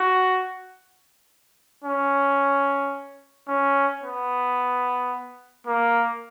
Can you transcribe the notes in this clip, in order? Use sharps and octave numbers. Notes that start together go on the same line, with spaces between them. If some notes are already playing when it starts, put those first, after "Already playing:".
Already playing: F#4
C#4
C#4
B3
A#3